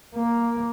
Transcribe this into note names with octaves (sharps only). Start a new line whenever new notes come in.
A#3